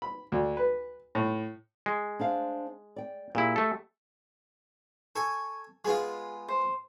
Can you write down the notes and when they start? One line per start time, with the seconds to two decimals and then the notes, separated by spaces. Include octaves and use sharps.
0.02 B5
0.32 D2
0.57 B4
1.15 A2
1.86 G#3
2.19 D4 C5 F5
2.96 D5 G5
3.35 A#2 E4 G4 G#4
3.56 A3 A4
5.16 A4 G#5 C#6
5.85 G#3 B3 F4 G#4
6.48 C5